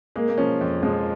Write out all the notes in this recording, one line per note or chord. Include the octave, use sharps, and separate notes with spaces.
G#3 A#3
A#3
F3 C#4
F2
F3 G#3